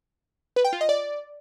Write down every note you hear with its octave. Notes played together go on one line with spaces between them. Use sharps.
B4
G5
F4
D#5
D5